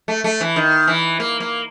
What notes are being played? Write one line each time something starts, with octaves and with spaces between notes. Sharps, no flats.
A3
A3
E3
D#3
E3
A#3
A#3